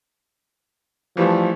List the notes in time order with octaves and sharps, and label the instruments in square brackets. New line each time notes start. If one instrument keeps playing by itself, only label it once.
[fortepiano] E3 G3 A3 [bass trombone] F3